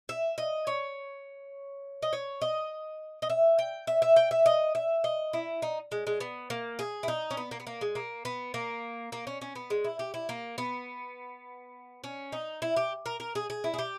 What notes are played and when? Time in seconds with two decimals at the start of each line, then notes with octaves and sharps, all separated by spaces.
0.09 E5
0.38 D#5
0.67 C#5
2.02 D#5
2.13 C#5
2.42 D#5
3.22 D#5
3.30 E5
3.59 G5
3.87 E5
4.02 E5
4.16 G5
4.31 E5
4.46 D#5
4.75 E5
5.04 D#5
5.33 E4
5.62 D#4
5.92 G#3
6.07 G#3
6.20 B3
6.50 A#3
6.79 G#4
7.03 E4
7.08 D#4
7.30 C#4
7.37 B3
7.51 A#3
7.60 B3
7.67 A#3
7.81 G#3
7.95 A#3
8.25 B3
8.54 A#3
9.12 A#3
9.27 C#4
9.41 C#4
9.55 B3
9.70 G#3
9.84 E4
9.99 G4
10.14 E4
10.29 A#3
10.58 B3
12.04 C#4
12.32 D#4
12.62 E4
12.76 G4
13.06 A#4
13.20 A#4
13.35 G#4
13.50 G#4
13.64 E4
13.74 G#4
13.78 G4